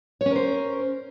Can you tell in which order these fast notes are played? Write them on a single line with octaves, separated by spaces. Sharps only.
C#5 C#4 A#4 C5